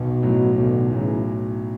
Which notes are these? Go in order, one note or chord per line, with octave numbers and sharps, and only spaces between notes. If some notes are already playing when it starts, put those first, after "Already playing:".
Already playing: B1 B2
A2 F#3
B1 B2 D3
A2 C#3 E3 F#3